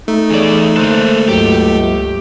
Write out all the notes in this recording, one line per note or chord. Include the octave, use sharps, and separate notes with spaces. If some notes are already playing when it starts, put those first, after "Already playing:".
A3 D#4
E2 G#4 C#5 D5
D3 A#3 A4 C5 F#6
C#2 G2 F#3 A#3 G4